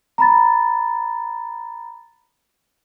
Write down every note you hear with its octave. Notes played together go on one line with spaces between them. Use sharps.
A#5 B5 A6